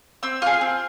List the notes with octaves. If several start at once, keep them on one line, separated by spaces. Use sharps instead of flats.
C4 E6
F4 G#4 F6
C4